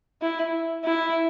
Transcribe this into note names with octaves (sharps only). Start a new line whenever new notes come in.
E4
E4